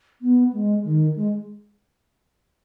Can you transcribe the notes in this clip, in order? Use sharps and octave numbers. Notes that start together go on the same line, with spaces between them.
B3
G#3
D#3
G#3